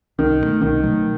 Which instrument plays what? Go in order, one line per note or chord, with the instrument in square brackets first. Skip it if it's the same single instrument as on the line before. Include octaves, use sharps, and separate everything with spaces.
[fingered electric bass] C2 [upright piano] D#3
[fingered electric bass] B2 F#3
A3
[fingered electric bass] C2 [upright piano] D#3
[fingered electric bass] B2 F#3 A3